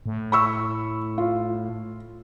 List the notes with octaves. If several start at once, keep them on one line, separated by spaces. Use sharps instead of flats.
A2
B5 C#6 E6
F4